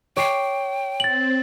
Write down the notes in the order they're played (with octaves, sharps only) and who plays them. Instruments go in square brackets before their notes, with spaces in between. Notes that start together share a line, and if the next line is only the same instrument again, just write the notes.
[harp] C#5 D6 C7 [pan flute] G5
[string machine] C4 [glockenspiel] A6 F#7